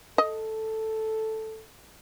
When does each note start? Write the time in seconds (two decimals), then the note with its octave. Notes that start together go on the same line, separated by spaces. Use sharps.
0.18 A4 D#5